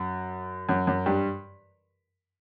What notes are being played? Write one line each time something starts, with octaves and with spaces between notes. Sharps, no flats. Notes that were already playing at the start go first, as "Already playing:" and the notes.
Already playing: F#2
F#2
F#2
G2